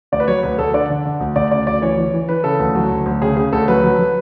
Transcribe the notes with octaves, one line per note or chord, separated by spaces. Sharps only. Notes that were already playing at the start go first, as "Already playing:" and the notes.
D2 D5
B4
F#3 C#5
D2 B4
D2 A4
D3 D5
D3
D3
D2
D2 D5
C#3 D5
D2 D5
E3 C#5
E3
E3
E3 B4
C#3 A4
D2
F#3
D2
D2
C#3 G#4
C#3 G#4
D2 A4
F#3 B4
F#3
F#3